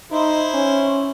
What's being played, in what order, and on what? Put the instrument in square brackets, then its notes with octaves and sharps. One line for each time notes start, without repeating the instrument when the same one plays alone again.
[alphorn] D#4 [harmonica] E4 C5
[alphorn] C#4